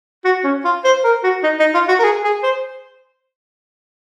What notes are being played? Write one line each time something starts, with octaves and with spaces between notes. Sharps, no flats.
F#4
C#4
F4
C5
A#4
F#4
D#4
D#4
F4
F#4
A#4
G#4
G#4
C5